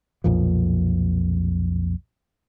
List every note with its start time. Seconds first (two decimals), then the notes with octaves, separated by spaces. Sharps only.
0.24 B1 F2 A#2 F3